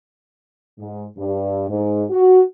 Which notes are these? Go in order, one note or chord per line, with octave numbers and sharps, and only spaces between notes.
G#2
G2
G#2
F#4